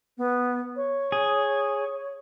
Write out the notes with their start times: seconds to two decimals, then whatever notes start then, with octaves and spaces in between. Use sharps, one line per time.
0.18 B3
0.76 C#5
1.12 G#4